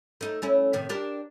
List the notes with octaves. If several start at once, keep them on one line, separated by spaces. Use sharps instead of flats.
A3 D#4
A3 C#4 E4
A2 C3 D#3
D4 G4 A#4